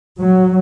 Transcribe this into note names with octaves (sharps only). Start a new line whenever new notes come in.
F#3